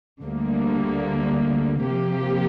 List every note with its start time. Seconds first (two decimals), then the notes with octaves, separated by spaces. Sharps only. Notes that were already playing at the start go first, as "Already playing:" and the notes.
0.22 D2 D3 G3 A#3
1.83 C3 F3 A#3 G4